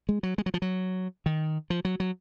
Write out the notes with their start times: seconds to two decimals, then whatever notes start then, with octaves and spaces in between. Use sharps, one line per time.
0.09 G#3
0.23 F#3
0.38 G#3
0.46 F#3
0.54 F3
0.62 F#3
1.26 D#3
1.70 F3
1.85 F#3
2.00 F#3